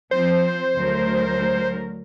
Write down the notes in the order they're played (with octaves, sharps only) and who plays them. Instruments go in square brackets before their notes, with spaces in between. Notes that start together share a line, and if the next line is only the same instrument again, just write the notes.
[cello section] F3 C4 [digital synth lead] C5
[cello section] D2 F#3 A#4